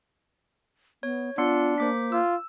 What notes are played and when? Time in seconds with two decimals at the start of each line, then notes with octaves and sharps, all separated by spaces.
1.03 B3 C#5
1.38 B3 D4 F4 C6 C#7
1.78 A#3 C5 D6 B6
2.12 F4 E6